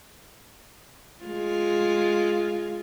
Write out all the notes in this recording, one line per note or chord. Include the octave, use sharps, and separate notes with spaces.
G#3 F4